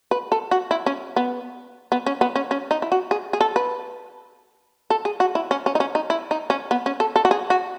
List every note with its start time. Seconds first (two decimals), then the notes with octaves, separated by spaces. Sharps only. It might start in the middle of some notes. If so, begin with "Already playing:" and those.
0.11 B4
0.32 A4
0.51 F#4
0.71 E4
0.86 C#4
1.16 B3
1.92 B3
2.06 C#4
2.21 B3
2.36 C#4
2.51 C#4
2.71 D#4
2.82 E4
2.92 F#4
3.11 G#4
3.33 G#4
3.41 A4
3.56 B4
4.90 A4
5.05 G#4
5.20 F#4
5.35 E4
5.51 C#4
5.66 C#4
5.75 D#4
5.80 C#4
5.95 D#4
6.10 E4
6.31 D#4
6.50 C#4
6.71 B3
6.86 C#4
7.00 A4
7.16 A4
7.25 F#4
7.31 G#4
7.50 F#4